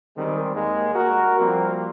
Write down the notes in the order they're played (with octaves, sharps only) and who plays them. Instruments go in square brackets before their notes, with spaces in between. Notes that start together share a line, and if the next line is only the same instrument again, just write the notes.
[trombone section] D#3 G3 G#3 C4
D#2 G#3 A#3
F#4 A#4
F3 G3 A#3 C4